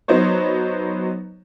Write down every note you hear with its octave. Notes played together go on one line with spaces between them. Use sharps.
F#3 B3 D#4 C5 C#5